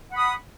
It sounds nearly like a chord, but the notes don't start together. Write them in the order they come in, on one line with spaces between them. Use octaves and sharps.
F#5 B5 D#6